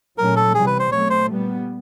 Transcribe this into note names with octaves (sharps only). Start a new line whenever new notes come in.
A#2 F#3 A3 C#4 A#4
A4
C3 E3 G3 G#4
B4
C5
B2 F#3 A3 C4 C#5
C5
A#2 G3 B3